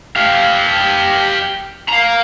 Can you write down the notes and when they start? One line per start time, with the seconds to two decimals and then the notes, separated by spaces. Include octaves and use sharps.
0.16 G4 F5
1.89 F5 A#5